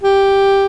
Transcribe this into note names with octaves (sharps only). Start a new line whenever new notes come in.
G4